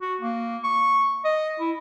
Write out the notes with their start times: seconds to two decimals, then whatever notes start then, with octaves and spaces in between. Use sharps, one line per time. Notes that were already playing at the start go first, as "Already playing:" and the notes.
0.02 F#4
0.21 A#3
0.64 C#6
1.25 D#5
1.59 E4